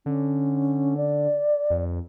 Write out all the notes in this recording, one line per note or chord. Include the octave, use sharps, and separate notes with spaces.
D3 C#4
D5
F2